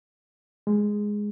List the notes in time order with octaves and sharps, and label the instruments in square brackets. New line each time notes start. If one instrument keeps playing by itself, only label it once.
[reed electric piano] G#3